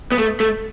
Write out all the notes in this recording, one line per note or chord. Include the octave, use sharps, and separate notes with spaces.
B3
A3
A3